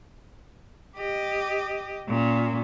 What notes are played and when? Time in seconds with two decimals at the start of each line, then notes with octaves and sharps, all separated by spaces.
0.97 G4 D#5
2.08 A#2 C#4